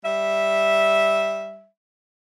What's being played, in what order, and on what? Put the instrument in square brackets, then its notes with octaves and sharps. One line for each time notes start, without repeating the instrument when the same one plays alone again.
[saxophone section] G3 E5